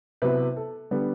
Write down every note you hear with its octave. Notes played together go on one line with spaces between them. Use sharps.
C3 F#3 B3 E4 B4
A4
D3 G3 B3